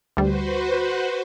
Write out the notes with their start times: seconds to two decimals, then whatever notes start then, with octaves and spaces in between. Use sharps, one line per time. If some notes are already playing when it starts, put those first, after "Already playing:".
0.17 D2 G3 F#4 B4 C5